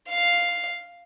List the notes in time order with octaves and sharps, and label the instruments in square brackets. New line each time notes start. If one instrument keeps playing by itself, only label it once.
[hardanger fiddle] F5